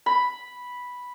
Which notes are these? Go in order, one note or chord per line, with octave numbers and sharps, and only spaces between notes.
B5